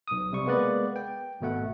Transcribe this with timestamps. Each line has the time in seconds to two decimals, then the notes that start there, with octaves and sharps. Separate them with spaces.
0.08 B1 D#6
0.32 C3 G3 C#6
0.46 G#3 A#3 B3 B4 D5
0.96 G5
1.41 G#1 B2 A3 F#5